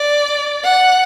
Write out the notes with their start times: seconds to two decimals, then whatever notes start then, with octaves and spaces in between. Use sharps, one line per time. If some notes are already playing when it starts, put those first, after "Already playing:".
Already playing: D5
0.63 F#5